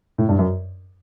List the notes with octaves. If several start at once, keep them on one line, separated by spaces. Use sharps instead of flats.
A2
G2
F#2